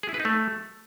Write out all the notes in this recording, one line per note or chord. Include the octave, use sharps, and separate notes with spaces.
G#4
E4
B4
D#4
A3